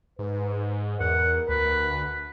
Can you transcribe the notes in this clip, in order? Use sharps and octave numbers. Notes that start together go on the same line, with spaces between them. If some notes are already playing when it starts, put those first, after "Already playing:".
G#2 B4
E2 A#4 F#5
D2 B4